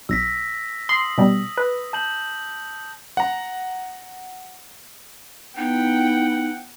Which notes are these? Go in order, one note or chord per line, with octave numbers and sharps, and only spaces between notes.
B1 E6 A#6 B6
C6 D#6 F#7
B2 G3
B4
A5 G6 F#7
F#5 A#5
B3 D#4 E4 F#5 G5